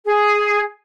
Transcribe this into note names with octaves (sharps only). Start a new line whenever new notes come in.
G#4